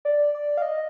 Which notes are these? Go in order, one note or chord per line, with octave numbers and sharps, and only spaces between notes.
D5
D5
F5
D#5